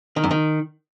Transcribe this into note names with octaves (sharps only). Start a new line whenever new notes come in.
D#3
F#2
D#3